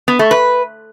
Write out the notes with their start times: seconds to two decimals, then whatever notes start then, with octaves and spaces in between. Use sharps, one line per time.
0.08 B3
0.19 A3
0.31 B4